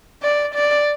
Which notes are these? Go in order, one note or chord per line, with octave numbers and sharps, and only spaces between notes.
D5
D5